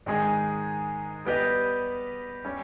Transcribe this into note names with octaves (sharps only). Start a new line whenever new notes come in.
G#2 D#3 G#3 D#4 G#4
G3 B3 G4 B4 D#5
G3 C#4